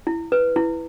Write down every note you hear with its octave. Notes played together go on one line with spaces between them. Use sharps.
E4
B4
E4